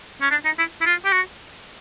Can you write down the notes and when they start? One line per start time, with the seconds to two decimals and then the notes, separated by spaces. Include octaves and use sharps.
0.21 C#4
0.31 D4
0.45 D#4
0.59 E4
0.81 E4
0.86 F4
1.05 G4
1.12 F#4